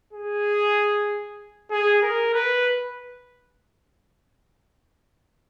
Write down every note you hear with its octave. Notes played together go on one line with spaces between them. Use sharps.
G#4
G#4
A#4
B4